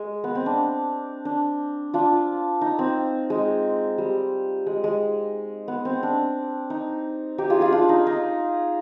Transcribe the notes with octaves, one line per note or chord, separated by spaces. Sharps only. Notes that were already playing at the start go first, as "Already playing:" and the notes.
Already playing: G#3
B3
C4
D4
D4
D4 F4
D#4
C4
G#3
G3
G#3
G#3
B3
C4
D4
D#4
D#4 G4
F4 G#4
F4 G#4
D4 F4
D#4
D#4